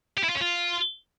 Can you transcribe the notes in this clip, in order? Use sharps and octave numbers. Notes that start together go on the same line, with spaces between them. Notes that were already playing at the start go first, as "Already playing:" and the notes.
G4
E4
F4
C#4
F4